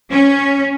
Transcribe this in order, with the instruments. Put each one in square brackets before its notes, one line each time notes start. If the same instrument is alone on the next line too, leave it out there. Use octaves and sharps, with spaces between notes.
[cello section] C#4